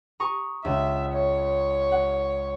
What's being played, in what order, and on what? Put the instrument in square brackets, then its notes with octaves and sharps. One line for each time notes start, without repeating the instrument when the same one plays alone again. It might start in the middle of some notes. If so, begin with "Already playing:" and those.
[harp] A#5 C#6 D#6
[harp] C#2 [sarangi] E5
[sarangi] C#5
[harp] F#5